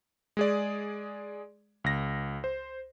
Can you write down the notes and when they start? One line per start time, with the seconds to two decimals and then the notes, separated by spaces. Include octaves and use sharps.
0.37 G#3 G#4 D5
1.84 C#2 A#6
2.44 C5